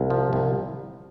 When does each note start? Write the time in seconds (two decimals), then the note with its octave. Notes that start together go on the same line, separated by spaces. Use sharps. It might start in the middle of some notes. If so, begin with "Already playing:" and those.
Already playing: C2
0.10 F3
0.33 C2